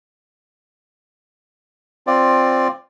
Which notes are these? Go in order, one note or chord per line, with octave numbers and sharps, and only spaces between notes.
C4 F4 D5